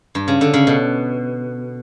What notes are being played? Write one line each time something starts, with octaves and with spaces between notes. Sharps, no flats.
G2
C#3
D3
C#3
B2